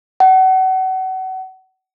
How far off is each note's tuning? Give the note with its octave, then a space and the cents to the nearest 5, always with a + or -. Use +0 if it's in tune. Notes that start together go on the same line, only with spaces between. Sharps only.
F#5 +30